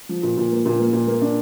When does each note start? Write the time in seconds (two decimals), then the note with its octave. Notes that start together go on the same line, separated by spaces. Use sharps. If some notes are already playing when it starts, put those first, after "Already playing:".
0.09 F3
0.23 A#2
0.37 A#2
0.52 A#3
0.66 A#2
0.80 A#3
0.93 A#2
1.07 A#3
1.22 D4